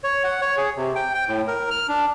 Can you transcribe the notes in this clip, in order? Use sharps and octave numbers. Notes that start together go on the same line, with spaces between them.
C#5
F#5
C#5
G#4
C3
G5
G5
A2
A#4
F6
D4